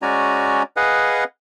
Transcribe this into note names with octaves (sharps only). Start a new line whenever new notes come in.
G#3 C#4 F#4 D5 G#5 A#5
G#4 B4 D#5 F5 F#5 G#5